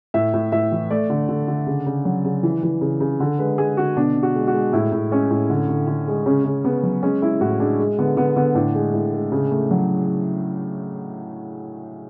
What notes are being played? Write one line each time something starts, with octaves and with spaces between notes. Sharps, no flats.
A2 E5
A2
A2 E5
E3
A3 D5
D3
D3
D3
C#3
C#3
F#3
C#3
E3
E3
C#3
C#3
D3
G#3 B4
G#3 G#4
D3 F#4
B2 D4
B2
F#4
G#3
F#4
G#3
A2 E4
A2
G#3 C#4
A2
D3
D3
D3
G#3
C#3 C#4
C#3
C#3 B3
F#3
G#3 C#4
G#3 E4
A2 F#4
G#3 D4
G#3
D3 B3
D3 B3
D3 B3
A2 D4
G#3
A2
G#3
C#3
A3
F#3